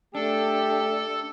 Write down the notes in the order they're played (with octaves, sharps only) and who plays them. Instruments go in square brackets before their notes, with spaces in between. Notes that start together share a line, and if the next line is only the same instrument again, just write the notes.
[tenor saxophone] A3 [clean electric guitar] D4 [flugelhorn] G4 [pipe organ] A4